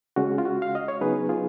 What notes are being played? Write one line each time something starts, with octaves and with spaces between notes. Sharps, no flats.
C#3 G#3 C#4 F#4
F4
F#4
F5
D#5
C#5
C#3 F#3 B3 D#4 G#4 B4
F4 G#4